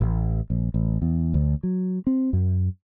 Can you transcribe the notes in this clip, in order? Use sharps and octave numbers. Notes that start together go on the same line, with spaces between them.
A1
A#1
A1
E2
D2
F#3
C4
F#2